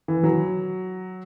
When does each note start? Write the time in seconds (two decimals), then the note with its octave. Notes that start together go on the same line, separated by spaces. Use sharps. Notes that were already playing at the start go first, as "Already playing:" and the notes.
0.08 E3
0.23 F#3